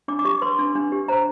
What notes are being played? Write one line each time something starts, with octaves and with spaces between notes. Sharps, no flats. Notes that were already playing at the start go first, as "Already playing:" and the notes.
D4 D6
D6
G4 C#6
B4 C6
D4
D4
G4
C5 A#5